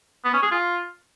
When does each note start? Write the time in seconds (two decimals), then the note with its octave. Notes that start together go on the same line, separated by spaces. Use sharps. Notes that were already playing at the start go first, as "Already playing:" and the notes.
0.25 B3
0.34 C#4
0.43 G#4
0.51 F4